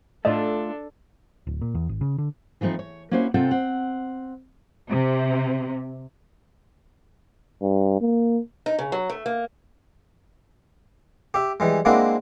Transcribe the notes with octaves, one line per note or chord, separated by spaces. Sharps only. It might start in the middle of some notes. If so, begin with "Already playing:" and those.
A2 A3 D4 F4 A4 D5 D#5
D1
A#2
E2
G#1
C#3
D3
E3 F3 A3 C4 D#4
C#5
A#3 C#4 E4 F#4 C5 C#5
C3 C4 F4 A4 F#5 G5
C4 F#5
C3
G2
A#3
D#4
C#3
F#3
A3
A#3
G4 E5
E3 G3 G#3
G#3 A#3 C4 D4 E4 F#4